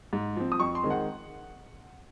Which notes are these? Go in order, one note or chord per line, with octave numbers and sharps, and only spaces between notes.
G#2
F3 C4
D#6
F2 C#6
C6
D#3 G#3 C4
F#5